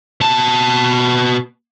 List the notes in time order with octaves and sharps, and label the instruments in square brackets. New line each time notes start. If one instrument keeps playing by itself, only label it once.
[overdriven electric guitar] B2 A5